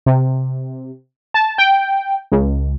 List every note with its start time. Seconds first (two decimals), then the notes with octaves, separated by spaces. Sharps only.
0.06 C3
1.34 A5
1.58 G5
2.32 C#2